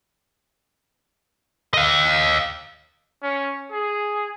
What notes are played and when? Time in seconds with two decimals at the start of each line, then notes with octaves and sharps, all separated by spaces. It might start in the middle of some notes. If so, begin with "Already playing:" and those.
1.74 D#5 F5
3.23 C#4
3.72 G#4